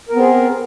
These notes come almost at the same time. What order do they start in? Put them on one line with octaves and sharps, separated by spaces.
A#4 B3 C4 G#4